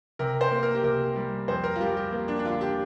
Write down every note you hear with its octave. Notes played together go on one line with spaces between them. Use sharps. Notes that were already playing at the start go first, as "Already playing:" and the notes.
C3 A#4
C5
A#3
A#4
G4
C3 A#4
G3
F2 C5
A#4
F4
G3 G4
G4
A#3
D4
D4
D3 F4
G4